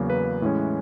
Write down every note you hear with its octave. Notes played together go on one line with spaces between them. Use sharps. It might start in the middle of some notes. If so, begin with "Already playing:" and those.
Already playing: E2 C#3 F#3 A#3
B4
A2 E3 G#3 C#4